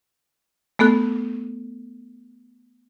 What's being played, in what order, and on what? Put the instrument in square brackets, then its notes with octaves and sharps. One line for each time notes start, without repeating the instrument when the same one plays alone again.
[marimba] A3 B3 A4 F#6